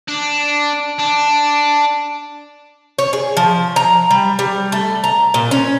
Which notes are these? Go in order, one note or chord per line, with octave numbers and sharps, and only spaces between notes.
D4
D4
C#5
G#4
F3
A#5
G3
G3
A3
A#5
A#2
C#4